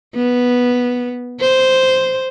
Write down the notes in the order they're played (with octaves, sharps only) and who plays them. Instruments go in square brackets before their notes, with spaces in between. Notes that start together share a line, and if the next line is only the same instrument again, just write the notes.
[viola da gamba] B3
C5